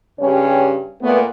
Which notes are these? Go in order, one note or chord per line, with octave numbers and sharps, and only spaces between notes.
G2 C#3 C#4 G4 C#5
A#2 A3 B3